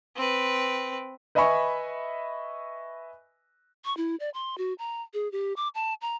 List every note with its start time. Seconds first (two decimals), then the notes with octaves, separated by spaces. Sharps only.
0.16 C4 B4
1.35 B4 D#5 E5 G#5 B5 C#6
3.85 C#6
3.97 E4
4.20 D5
4.34 C6
4.58 F#4
4.79 A#5
5.14 G#4
5.32 G4
5.56 D6
5.75 A5
6.01 A#5